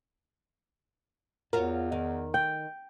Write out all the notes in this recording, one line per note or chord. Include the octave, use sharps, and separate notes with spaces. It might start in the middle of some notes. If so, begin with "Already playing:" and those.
E2 F4 F#4 A#4 C#5
D#3
G5